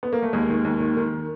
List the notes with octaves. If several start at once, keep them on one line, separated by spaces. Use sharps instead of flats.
B3
A#3
A3
D#2 G#3
D#3
D#2
D#3
D#3